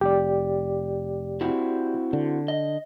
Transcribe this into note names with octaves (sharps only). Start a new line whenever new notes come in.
F1 G4 D5
C4 E4 F#4
D3
D#5